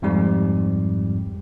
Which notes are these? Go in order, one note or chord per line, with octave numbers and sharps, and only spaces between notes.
F2 G#2 G3